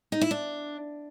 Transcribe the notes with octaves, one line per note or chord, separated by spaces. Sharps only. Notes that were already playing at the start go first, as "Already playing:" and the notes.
D#4
E4
D4